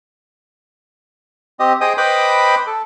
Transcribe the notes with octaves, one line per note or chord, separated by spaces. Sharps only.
C4 G4 D#5
G#4 C5 D#5 G5 D#6
B4 C5 D#5 G5 B5 D6
A4